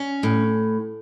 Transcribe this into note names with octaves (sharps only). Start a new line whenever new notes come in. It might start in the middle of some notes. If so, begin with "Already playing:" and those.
Already playing: C#4
A2